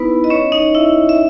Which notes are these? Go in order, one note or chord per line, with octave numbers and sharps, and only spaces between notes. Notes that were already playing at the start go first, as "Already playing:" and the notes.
Already playing: B3 D#4 E4 B4
D#5
C#4 C#5
D#4 D#5
E4 E5
E5